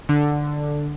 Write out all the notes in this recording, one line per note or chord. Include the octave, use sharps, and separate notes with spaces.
D3